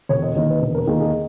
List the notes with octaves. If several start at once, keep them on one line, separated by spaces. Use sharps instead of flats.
E1 C#5
D#5
D#2 D#3 A#3 D#5
B4
E1 B4
A#4
D#2 D#3 A#3 G#4
G#4